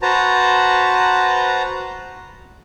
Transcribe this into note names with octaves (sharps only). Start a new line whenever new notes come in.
F#4 B4 C5 A5 A#5